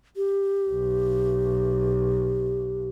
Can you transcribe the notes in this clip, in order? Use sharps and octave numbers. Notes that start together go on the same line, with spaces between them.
G4
B1